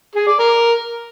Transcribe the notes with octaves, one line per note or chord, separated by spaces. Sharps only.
G#4
D5
A#4